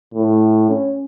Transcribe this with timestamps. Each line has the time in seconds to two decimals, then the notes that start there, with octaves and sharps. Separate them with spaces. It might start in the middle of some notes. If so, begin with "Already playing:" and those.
0.14 A2
0.70 C#4